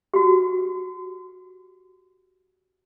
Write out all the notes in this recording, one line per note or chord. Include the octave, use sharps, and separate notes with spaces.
F#4 G4